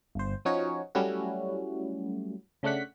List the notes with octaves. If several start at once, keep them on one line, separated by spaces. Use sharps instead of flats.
G1 C5
F3 C#4 D#4 F#4 C#5
F#3 G3 A3 C#4 E4 F#4
C#3 A3 D4 F#5 B6